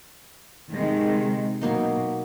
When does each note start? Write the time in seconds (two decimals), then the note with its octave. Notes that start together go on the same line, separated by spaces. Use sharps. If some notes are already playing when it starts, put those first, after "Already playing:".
0.73 C3 D#3 G#3
1.61 B2 F#3 A#3 D#4